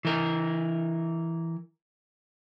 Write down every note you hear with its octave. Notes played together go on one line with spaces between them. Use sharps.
E3 A#4